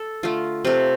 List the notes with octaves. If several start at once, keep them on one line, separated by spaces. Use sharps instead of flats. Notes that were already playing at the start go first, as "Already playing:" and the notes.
Already playing: A4
D3 A3 F4
C3 A3 F4